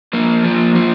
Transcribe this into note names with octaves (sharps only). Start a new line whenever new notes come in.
F3 A#3
F3
F3